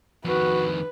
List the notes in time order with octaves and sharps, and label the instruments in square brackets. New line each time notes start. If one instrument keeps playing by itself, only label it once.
[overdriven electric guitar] F2 D#3 [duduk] F#4 [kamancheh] B4